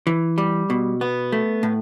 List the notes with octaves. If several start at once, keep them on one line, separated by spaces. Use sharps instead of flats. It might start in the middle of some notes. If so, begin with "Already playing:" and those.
E3
G3
B2
B3
A3
A2